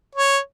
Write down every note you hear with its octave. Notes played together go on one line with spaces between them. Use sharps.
C#5